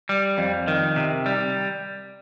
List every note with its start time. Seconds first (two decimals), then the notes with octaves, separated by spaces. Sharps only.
0.09 G3
0.38 F2
0.68 D#3
0.96 C3
1.26 G3